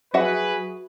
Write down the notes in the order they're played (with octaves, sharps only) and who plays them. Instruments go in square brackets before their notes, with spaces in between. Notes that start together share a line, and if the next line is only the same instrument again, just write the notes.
[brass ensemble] F#3 G#4 B4 [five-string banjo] F#4 E5 F#5